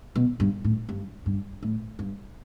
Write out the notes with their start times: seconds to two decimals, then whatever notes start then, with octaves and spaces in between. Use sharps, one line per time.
0.15 B2
0.40 G2
0.64 A2
0.89 G2
1.26 G2
1.63 A2
1.99 G2